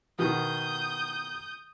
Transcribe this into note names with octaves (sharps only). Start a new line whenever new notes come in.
B2 D#3 B3 D#6 G6